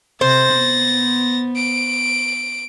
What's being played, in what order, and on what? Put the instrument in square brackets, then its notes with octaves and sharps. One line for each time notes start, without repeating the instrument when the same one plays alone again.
[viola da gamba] C3 [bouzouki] C5 [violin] A6 A#6
[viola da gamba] B3
[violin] D7